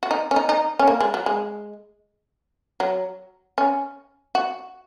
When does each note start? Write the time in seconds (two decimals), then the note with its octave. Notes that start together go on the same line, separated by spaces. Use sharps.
0.03 F#4
0.11 D#4
0.31 C#4
0.36 D#4
0.49 D#4
0.79 C#4
0.87 A#3
1.01 G#3
1.14 F#3
1.26 G#3
2.80 F#3
3.58 C#4
4.35 F#4